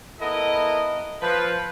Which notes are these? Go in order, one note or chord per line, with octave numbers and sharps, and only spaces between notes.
B3 E4 A4 A#4 D#5
F3 B4